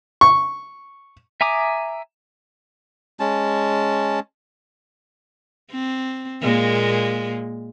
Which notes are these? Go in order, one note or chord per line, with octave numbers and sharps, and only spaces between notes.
C#6
E5 G#5 A#5 D6 D#6
G#3 C#4 A5
C4
A#2 G#3 A#3